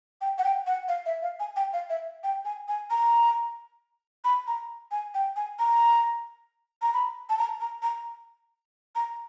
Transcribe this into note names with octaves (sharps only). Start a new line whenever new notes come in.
G5
F#5
G5
F#5
F5
E5
F5
G#5
G5
F5
E5
G5
G#5
G#5
A#5
B5
A#5
G#5
G5
G#5
A#5
A#5
B5
A5
A#5
A#5
A#5
A#5